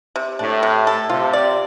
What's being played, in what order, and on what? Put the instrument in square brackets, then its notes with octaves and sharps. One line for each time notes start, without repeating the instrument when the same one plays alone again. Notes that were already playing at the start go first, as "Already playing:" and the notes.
[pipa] C3
[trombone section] A2 [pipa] D4
[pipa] C3
A4
[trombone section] C3 [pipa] F4
[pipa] D5